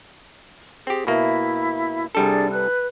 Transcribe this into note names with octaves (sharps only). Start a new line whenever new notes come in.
C4 G4 G#4
B2 A#3 E4 E5
C2 G3 D4 G#4 A4
B4 F#6